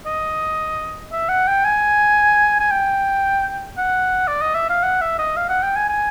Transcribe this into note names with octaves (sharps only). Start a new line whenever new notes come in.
D#5
E5
F#5
G5
G#5
G#5
G5
F#5
D5
D#5
E5
F5
F#5
E5
D#5
F5
F#5
G5
G#5
G#5